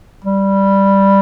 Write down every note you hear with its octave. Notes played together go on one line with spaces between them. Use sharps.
G3